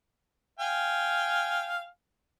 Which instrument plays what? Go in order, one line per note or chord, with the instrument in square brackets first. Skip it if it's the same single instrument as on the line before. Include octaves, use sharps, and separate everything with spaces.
[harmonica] F5 G5 G#5